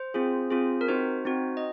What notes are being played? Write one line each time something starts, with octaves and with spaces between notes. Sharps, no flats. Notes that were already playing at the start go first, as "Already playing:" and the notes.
Already playing: C5
C4 F4 G#4
C4 F4 G#4
A#4
C4 D#4 F#4 C5
C4 D#4 F#4
D#5